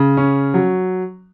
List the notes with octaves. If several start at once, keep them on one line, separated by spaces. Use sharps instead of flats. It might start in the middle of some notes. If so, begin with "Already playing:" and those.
Already playing: C#3
C#4
F#3